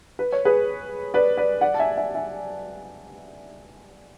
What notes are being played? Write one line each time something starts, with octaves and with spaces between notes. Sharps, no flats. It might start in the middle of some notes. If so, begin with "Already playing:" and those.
B4
C#5
G#4 B4
B4 D5
B4 D5
D5 F#5
A5
E5 G#5
E5 G#5
E5 G#5